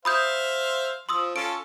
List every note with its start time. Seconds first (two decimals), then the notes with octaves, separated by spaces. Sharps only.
0.05 C5 E5 F5 B5 D#6 G6
1.09 F3 C6 D#6 E6
1.36 C#4 F4 A4 D7